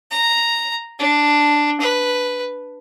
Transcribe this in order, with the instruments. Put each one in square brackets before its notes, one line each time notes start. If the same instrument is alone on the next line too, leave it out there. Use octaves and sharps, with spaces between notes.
[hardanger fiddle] A#5
D4
B4